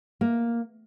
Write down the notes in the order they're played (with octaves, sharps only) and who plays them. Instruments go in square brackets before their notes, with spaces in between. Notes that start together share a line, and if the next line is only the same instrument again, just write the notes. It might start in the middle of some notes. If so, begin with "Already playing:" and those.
[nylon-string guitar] A#3